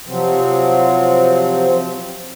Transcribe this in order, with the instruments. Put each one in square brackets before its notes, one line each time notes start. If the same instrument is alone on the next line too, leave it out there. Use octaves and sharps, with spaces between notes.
[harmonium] C3 F3 F#3 C4